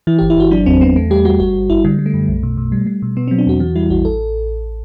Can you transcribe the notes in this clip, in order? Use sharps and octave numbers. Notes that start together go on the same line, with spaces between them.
E3 E4
G1 G4
E4
G1 F#4
F#3 D4
E2 C4
E2 B3
E2 A3
G3 G4
G3 F#4
G1 F#4
G1
G1 E4
D3 G3
G3
A3
F#2
B1
B2
B2
G3
G3
B2
B2 B3
F#3 C4
D4
E2 F#4
E3 F#4
G3 E4
A1 F#4
A4